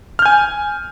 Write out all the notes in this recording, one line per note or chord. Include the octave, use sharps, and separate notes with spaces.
G#5 F6 G6